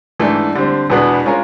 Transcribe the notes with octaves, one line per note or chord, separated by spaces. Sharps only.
G#2 E3 A3 D4
D3 G3 C4
E2 B2 G#3 B3 D4
G#3 C#4 F4 A#4